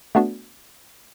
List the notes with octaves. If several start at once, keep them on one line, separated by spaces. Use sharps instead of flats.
A3 B3 D4 F#4